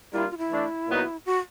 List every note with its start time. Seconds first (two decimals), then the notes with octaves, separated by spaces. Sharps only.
0.13 G3 A#3 D4 E4 F4
0.31 F4
0.38 E4
0.50 E3 A3 D4
0.88 A#2 F#3 B3 D#4 F#4
1.26 F#4